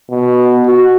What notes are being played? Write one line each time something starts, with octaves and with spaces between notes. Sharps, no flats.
B2
F#4